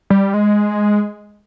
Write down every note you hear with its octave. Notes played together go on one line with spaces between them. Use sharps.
G3
G#3